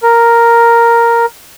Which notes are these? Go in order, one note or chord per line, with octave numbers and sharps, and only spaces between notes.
A#4